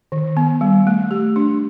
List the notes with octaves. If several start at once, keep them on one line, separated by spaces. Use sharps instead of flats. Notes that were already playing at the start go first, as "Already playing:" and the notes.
D#3
B3
G3
A3
G4
D4